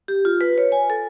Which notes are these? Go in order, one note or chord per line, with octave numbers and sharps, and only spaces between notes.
G4
F4
B4
C#5
G#5
A4